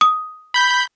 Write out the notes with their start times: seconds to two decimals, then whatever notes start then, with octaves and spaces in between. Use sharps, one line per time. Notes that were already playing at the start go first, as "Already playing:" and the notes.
0.01 D#6
0.54 B5 G6